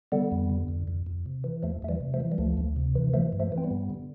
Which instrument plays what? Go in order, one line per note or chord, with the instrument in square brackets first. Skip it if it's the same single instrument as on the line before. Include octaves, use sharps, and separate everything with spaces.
[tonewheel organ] D3 G3 B3
F2
D3
F2
F2
F2
C3
E3
E2 F3 A3
E2 A3
E3 G3
C3
F3 A3
E3
G3
D2 F3 A3
D2
C3
E3
E3 F3 A3
G2
F3 A3
E3
C4
G3 B3
G2
D3